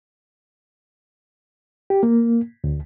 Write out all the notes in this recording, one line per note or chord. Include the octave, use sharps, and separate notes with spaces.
G4
A#3
D2